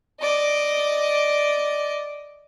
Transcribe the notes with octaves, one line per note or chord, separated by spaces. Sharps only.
D5 D#5